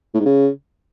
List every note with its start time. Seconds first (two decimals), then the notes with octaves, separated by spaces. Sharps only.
0.14 A2
0.20 G#2
0.26 C#3